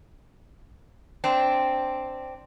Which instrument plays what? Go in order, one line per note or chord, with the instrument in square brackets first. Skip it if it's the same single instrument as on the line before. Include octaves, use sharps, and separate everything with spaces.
[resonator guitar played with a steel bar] C4 D4